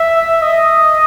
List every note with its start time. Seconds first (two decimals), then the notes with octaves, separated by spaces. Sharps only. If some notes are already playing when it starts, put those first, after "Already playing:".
Already playing: E5
0.42 D#5